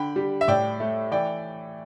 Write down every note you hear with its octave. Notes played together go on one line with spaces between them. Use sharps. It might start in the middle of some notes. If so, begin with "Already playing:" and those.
Already playing: D3 G5 B5
G3
E5
A2 D5 G5
A3
E3 D5 G5